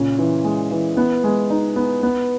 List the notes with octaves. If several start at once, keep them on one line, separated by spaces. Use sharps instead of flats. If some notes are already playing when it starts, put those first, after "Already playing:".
Already playing: A#2 C#3
E3
G#3
E3
B3
G#3
D#4
B3
B3